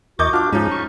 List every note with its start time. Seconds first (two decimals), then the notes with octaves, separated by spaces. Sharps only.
0.19 E2 F#4 A#4 D#5 D6 G6 A6
0.33 D4 F4 F#4 D6 F6
0.53 G#2 F3 G#3 C#4 D#4
0.71 C#6